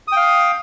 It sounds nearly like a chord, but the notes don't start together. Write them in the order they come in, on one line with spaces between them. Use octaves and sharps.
D#6 G5 F5